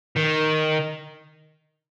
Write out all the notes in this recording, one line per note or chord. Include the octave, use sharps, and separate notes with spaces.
D#3